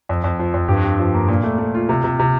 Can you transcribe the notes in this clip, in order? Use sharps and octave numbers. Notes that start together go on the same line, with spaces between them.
F2
F2
F3
F2
G2 G4
G4
F3
A#3
A#2
A3
A3
F4
C3
C3
C3